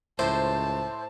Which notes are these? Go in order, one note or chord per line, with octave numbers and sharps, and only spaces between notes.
C#2 A2 C5 A5